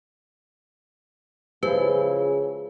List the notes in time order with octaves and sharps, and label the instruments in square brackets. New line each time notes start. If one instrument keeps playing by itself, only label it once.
[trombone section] C#3 [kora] F3 G#3 E4 [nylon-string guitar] G#4 [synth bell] B4